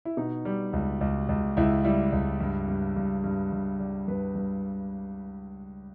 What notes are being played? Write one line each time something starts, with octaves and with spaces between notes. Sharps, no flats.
E4
B2 D#4
G3
C#2
C#2
C#2
C#2 E4
G3 E4
C#2
G2
G2
G2
G2
G2
G3
G2 B4
G2